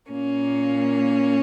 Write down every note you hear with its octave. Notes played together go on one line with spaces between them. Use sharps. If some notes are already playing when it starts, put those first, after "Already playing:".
A#2 A#3 C#4